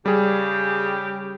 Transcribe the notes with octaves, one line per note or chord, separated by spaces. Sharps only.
C#3 G3 G4 G#4